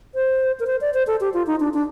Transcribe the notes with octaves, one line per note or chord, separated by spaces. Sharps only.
C5
A#4
C5
D5
C5
A4
G4
F4
D#4
D4
D4